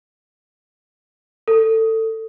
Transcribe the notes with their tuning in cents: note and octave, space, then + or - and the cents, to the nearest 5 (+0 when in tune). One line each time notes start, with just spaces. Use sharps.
A4 +20